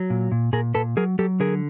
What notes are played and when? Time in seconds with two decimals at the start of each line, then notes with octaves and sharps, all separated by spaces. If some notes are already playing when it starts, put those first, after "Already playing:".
Already playing: F#3
0.10 A#2
0.32 A#2
0.53 A#2 G#4 A#4
0.74 A#2 A4 B4
0.97 F#3 G#4 A#4
1.19 F#3 G4 A4
1.40 D3 G#4 A#4